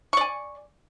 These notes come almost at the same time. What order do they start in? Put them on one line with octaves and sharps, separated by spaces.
C#6 D5 G#5